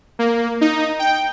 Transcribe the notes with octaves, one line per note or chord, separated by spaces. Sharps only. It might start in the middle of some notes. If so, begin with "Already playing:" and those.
A#3
D#4
G5